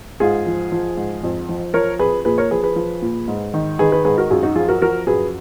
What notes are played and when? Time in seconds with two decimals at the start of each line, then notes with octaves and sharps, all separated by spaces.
0.20 G#2 F4 G#4
0.46 F3
0.72 F3
0.97 G#2
1.23 F2
1.49 F3
1.74 F3 A#4 C#5
1.99 F2 G#4 B4
2.25 A#2 G#4 B4
2.38 A#4 C#5
2.51 F3 G#4 B4
2.63 G#4 B4
2.76 F3
3.02 A#2
3.28 G#2
3.54 D#3
3.79 D#3 G#4 B4
3.92 G#4 B4
4.05 G#2 G#4 B4
4.18 F#4 A#4
4.30 F#2 F4 G#4
4.43 D#4 F#4
4.56 F3 F4 G#4
4.68 F#4 A#4
4.82 F3 F#4 A#4
5.07 F#2 G#4 B4